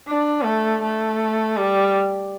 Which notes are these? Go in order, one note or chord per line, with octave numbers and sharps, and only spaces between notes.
D4
A3
A3
G3